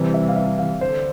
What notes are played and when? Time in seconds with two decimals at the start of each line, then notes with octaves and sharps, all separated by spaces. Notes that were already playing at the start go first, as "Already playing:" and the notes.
Already playing: C3 E3 G3
0.14 E5
0.29 F5
0.36 E5
0.59 F5
0.81 D3 C5